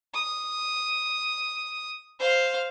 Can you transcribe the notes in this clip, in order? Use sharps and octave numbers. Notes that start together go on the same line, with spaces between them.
D#6
C5 F5